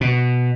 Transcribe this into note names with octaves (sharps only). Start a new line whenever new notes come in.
B2